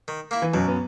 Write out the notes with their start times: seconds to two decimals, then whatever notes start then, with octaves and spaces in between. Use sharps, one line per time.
0.08 D#3
0.31 A#3 E4
0.42 E3
0.53 F#2 B2 F#3
0.68 B3